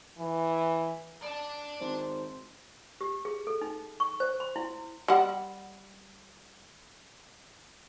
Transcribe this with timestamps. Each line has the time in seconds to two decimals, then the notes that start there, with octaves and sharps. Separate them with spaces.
0.18 E3
1.23 D5 A5
1.81 G#1 C5
3.01 G4
3.25 G#4
3.47 A4
3.61 D#4
4.00 C#6
4.20 C5
4.40 C6
4.56 E4
5.08 G3 F#5